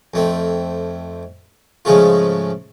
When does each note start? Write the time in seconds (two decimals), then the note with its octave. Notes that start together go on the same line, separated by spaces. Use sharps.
0.14 F2 A3 C4
1.85 G#2 C#3 F3 G#3 A3 F4